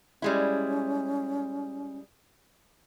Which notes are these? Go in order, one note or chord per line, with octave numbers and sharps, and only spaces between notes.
G3 G#3 C#4 E4